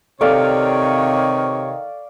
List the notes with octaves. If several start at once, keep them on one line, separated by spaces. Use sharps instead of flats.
C3 D#3 A4 C#5 D5 F5 C#6